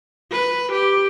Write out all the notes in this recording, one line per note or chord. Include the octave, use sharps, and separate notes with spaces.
B4
G4